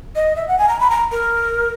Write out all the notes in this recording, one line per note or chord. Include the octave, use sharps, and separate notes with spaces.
D#5
E5
F#5
G#5
A#5
B5
A#5
A#4